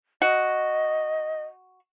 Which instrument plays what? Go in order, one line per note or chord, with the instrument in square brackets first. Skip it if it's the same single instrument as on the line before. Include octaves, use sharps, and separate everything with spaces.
[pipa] F#4 [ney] D#5